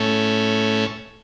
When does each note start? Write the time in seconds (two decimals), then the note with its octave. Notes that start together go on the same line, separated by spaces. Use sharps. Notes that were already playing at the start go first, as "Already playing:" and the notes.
Already playing: A2 A3 C#4